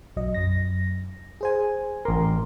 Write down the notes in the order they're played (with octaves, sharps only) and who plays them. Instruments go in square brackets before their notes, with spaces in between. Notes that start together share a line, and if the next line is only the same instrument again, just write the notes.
[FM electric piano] B1 F#3 D#5
F#2 A#6
G#4 C5 G#5
[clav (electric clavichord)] A1 A#4 [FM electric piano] C6 D6